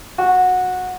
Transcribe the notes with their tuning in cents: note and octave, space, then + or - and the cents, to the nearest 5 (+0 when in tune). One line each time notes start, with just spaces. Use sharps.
F#4 -15